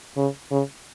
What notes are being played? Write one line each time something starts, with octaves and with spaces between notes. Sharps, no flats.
C#3
C#3